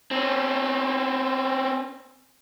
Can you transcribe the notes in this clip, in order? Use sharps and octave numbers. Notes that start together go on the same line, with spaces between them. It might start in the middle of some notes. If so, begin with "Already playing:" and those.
C4 C#4